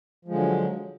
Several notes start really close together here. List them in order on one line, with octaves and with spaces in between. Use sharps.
F3 G#3 D3 F#3